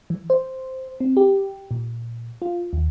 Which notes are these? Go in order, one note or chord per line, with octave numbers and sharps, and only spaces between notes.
E3
C5
C4
G4
A#2
F4
D#2